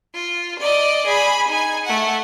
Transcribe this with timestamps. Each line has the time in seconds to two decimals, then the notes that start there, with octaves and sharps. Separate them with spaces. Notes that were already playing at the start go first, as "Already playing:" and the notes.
0.14 F4
0.60 D5 D#5
1.06 G#4 B5
1.48 D#4 G#5
1.85 A3 F#5